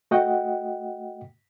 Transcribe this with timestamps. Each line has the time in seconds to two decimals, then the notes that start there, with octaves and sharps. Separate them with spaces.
0.11 A3 F#4 D#5 F#5 G5